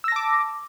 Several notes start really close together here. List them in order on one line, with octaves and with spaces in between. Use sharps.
E6 A#6 A5 D6